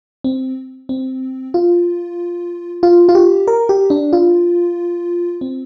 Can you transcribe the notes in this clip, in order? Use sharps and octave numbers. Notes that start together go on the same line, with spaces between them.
C4
C4
F4
F4
F4
G4
A#4
G4
D4
F4
C4